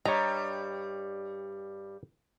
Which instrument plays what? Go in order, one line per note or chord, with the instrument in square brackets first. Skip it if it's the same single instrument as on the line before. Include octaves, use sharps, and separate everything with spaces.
[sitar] G2 G3 [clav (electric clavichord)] C#5 D#5 [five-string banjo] A#5